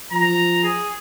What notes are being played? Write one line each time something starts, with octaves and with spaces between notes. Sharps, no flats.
F3 A#5
G#4